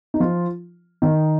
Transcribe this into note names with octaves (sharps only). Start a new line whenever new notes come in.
D#4
F3 F4
D#3 D#4